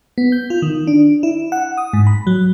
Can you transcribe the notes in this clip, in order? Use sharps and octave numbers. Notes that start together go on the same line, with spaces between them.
B3
G6
F4
D#3
D4
E4
F#5
D#6
G#2
B5
F#3